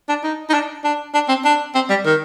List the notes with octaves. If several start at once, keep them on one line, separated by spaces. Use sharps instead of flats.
D4
D#4
D#4
D4
D4
D4
C4
D4
C4
G3
D#3